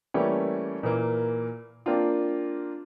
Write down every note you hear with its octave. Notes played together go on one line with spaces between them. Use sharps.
E3 G3 A3 A#3 C#4
A#2 E3 A#3
A#3 C4 D4 F4